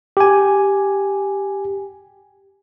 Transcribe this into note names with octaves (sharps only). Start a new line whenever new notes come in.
G4 G#5